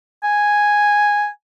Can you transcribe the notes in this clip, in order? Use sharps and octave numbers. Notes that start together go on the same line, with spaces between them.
G#5